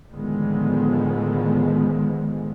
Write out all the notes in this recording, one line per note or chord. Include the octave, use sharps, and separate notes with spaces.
A2 D3 D#3 F3 G#3 B3